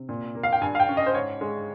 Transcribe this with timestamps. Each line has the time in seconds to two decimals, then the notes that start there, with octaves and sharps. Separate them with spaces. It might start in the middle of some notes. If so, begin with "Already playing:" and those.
Already playing: C3
0.09 A#2
0.35 A#3
0.43 F5
0.53 G5
0.62 G2 G#5
0.75 F5
0.80 G5
0.89 C#4
0.97 D#5
1.06 C5
1.14 G#2 C#5
1.41 G#3